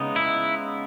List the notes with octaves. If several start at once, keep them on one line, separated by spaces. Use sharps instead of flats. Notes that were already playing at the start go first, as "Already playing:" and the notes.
Already playing: C#3 G#3 B3 D#4
E4